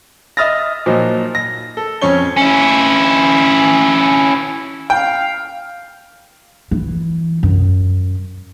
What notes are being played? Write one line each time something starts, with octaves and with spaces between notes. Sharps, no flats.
D#5 E5 D#6 F6 A6 A#6
A#2 F3 F#3 D#4
A#6
A4
F2 C#4 C#5 G7
C#4 E4
F5 G5
E3
F#2